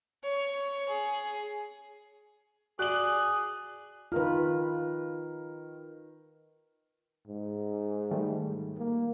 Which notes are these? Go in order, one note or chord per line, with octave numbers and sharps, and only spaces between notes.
C#5
G#4
F#4 G#4 D5 F#6 F#7
D#3 F4 A#4 B4 F6
G#2
D#3 G3 A3
A#3